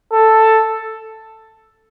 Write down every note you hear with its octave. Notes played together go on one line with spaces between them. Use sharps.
A4